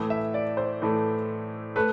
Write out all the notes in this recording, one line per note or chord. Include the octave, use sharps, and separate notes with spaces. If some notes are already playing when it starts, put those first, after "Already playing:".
Already playing: A2 E3 A3
E5
D5
C5
A2 E3 A3
A3 B4